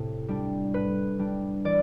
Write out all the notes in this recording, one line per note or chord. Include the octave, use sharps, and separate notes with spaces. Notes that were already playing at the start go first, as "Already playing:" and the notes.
Already playing: A2 C3 C4
G3 D4
A2 B4
G3 D4
E3 D5